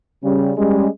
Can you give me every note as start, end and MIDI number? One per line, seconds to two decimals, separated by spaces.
0.23 0.52 49
0.23 0.52 55
0.23 0.52 61
0.57 0.86 55
0.57 0.86 56
0.57 0.86 61